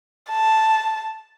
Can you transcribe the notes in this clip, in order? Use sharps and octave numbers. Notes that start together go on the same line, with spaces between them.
A5